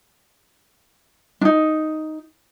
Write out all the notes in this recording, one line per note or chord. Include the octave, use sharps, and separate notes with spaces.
D4 D#4